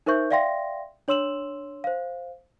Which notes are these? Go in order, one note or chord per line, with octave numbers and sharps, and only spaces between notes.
D#4 A#4 C5 E5 C#6 G6
D5 E5 F5 G5 C6 A#6
D4 C#5 C6 E6 E7 F#7
C5 F5